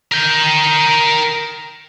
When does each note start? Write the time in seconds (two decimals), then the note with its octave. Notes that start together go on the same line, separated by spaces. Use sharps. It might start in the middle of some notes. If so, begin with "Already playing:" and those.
0.12 A#4 G5